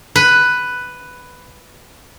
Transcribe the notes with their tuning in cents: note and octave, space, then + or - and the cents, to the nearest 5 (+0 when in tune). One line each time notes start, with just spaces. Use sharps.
B4 +5